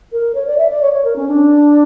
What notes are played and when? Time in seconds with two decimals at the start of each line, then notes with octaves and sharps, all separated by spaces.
0.12 A#4
0.35 C#5
0.47 D5
0.58 E5
0.70 D5
0.82 C#5
0.93 C#5
1.04 A#4
1.16 C#4
1.28 D4